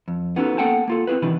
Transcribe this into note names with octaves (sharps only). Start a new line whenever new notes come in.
F2
B3 C#4 D#4 F#4 G#4 A4
A#3 B3 A4 F#5 G5 A5
A#3 F4 A4
C4 E4 F#4 G#4 B4
C3 D#3 E3 D4 E4 B4